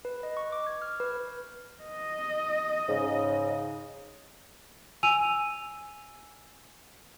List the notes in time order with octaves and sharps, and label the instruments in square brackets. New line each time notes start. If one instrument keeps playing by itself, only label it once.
[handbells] B4
D#5
C#6
D6
G#6
F6
B4
[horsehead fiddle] D#5
[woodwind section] G#2 C#3
[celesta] G#5 E6 D#7 F7